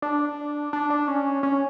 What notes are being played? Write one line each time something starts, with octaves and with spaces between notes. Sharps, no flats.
D4
D4
D4
C#4
C#4